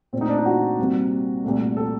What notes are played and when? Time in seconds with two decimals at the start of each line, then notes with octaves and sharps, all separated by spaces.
0.13 A#2 C4
0.17 A3 D#4
0.29 D4
0.38 D#4
0.46 F#4
0.79 C2 C3 G3 A#3
1.44 C2 A#2 A3
1.77 A4